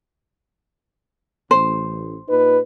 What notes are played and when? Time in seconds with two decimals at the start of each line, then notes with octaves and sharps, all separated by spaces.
1.51 A1 C5
2.29 A#2 D#4 B4